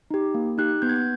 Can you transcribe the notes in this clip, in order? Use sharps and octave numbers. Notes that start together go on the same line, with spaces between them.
D#4 G4
A#3
D#4 G4 F#6
B3 G6
G#6
G6